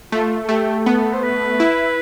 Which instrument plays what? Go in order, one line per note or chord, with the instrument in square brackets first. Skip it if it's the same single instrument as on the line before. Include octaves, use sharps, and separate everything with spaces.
[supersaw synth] A3 [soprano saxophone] F4
[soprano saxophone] A4
[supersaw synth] A3 [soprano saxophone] G4
[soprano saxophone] G4
[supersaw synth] B3 [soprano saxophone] A4
[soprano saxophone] C5
B4
[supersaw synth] E4